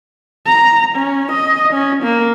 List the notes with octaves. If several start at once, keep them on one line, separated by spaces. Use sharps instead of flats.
A#5
C#4
D#5
C#4
A#3